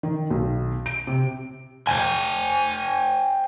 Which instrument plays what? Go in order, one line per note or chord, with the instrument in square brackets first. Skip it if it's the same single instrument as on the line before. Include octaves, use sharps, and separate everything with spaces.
[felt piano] D#3
B1
D7
C3
[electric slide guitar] C5 G5 G#5